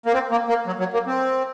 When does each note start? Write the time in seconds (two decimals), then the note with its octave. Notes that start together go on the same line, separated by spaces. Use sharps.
0.06 A#3
0.14 C4
0.31 A#3
0.49 A#3
0.67 F#3
0.79 F#3
0.93 A#3
1.07 C4